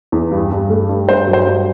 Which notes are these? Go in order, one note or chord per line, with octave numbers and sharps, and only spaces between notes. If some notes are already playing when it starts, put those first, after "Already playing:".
E2
G2
G2
A3
G2
G2 C5
F#3
C5
G2